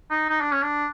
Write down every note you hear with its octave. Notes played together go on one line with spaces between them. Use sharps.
D#4
D#4
D4
C#4
D4